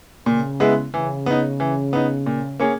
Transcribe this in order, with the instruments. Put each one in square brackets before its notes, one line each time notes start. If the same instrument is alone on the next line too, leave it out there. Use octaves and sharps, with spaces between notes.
[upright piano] A#2 [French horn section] C#3
[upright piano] G#3 B3 E4
[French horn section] C#3 [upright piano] E3
[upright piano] B3 D#4
E3
B3 D#4
A#2
A#3 C#4 G#4